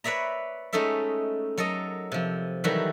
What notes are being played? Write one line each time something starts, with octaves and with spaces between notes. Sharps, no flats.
B4 C#5 D5 E5 A#5
G#3 A3 C#4 D#4 A4 E5
F#3 A4 A#4 D#5
C3 F3
D#3 E3 F#3 G3 F#4 A4